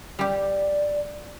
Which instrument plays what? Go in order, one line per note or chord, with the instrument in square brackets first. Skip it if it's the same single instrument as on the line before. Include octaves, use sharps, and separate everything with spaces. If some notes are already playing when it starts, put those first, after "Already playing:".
[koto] G3 G4 [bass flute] D5